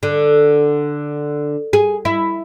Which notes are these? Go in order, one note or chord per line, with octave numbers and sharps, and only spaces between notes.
D3
G#4
E4